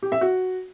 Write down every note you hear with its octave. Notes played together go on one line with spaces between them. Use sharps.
G4
E5
F#4